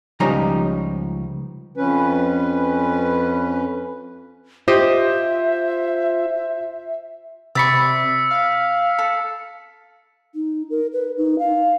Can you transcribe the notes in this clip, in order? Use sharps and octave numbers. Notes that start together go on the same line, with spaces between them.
C#2 F3 G3 C#4 D#4 A#5
F2 C#4 B4
F4 G4 C5 D#5 E5
C3 D5 B5 C#6 E6 B6 C#7
F5
A4
D#4
A#4
B4
D#4
F5